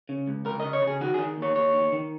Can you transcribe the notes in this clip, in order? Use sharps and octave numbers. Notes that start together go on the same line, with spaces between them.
C#3
C#2
C#2 A#4
D#5
C#3
C#5
C#3
G#4
D#3 F#4
D#3 G#4
D#2 C#5
D#2 C#5
D#3
D#3